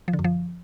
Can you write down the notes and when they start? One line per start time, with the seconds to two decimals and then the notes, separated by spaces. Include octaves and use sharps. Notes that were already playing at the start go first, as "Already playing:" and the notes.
0.08 F3
0.13 D3
0.19 F#2
0.24 F3